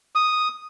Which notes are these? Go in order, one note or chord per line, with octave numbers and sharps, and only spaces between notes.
D#6